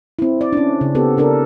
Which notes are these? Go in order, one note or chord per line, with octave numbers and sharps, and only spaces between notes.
C4 E4
D5
C#4 D4
C#3
B3 C4 G4 A4
C#3 D4 A4 A#4